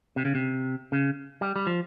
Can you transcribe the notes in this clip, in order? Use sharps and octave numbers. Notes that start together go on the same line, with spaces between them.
C3
C#3
C3
C#3
G3
G3
F3